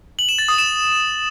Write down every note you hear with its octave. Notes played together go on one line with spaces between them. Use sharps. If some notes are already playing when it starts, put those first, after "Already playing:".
F#7
E7
A6
D#6
E7